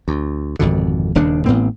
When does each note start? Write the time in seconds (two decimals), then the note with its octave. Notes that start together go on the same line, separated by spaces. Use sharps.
0.08 D2
0.59 G#1 F2 B2 D3
1.15 D#1 D#2 C#3 D4
1.46 A1 A2 B3 C4